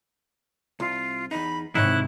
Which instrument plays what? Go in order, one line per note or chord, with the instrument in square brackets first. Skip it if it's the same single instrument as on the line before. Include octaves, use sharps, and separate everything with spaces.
[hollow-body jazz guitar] C2 [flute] F4
[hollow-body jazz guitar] E2 D#4 [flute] B5
[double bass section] G#2 C3 [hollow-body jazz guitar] D#3 D#4 C#5 [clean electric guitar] E4 [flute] F#6